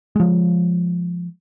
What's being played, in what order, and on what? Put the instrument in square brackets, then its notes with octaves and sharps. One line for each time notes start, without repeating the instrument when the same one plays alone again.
[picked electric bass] F3 G#3